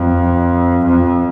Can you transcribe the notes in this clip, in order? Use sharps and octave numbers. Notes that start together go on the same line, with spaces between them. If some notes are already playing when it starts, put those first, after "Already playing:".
Already playing: F2
F2